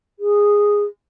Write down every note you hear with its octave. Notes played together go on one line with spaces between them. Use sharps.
G#4